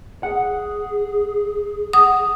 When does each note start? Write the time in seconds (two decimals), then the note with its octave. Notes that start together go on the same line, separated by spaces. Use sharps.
0.23 G#4 F#5
1.93 F#5 D#6